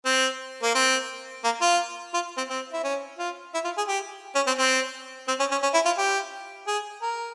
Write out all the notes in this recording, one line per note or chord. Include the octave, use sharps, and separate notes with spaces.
C4
A#3
C4
A#3
F4
F4
C4
C4
E4
C#4
F4
E4
F4
G#4
G4
C#4
C4
C4
C4
C#4
C#4
C#4
E4
F4
G4
G#4
A#4